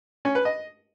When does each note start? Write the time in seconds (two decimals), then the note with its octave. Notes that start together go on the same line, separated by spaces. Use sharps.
0.25 C#4
0.35 B4
0.45 D#5